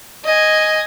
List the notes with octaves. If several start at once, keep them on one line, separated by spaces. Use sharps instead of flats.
D#5 G#5